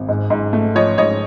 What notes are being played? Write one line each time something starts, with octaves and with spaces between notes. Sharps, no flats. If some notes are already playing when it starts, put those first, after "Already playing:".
Already playing: G#1
G#2
G#2
A3
F3 C#5 D#5
G#2 C#5 D#5